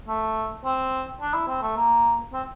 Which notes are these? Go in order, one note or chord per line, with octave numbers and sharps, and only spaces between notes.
A3
C4
D4
E4
C4
A3
A#3
C4